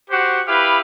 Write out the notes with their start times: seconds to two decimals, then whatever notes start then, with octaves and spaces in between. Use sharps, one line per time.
0.10 F#4 G4 C5 F#5
0.48 E4 G4 B4 F5